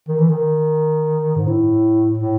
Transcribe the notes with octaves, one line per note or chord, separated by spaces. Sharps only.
D#3
E3
D#3
G#2
A2
A2